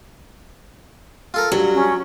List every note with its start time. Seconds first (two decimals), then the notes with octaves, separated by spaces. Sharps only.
1.34 F4 A4 A#4
1.52 G2 F#3
1.75 C#4